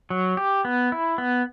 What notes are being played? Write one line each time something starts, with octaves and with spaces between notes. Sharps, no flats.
F#3
G4
B3
E4
B3